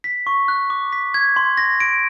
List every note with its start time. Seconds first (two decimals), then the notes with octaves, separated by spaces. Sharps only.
0.04 B6
0.27 C#6
0.48 F#6
0.70 D6
0.92 B6
1.14 G#6
1.36 C6
1.57 A#6
1.80 D7